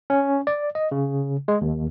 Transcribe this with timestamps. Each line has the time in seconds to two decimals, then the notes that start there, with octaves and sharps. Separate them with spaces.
0.10 C#4
0.47 D5
0.75 D#5
0.91 C#3
1.48 G#3
1.61 D#2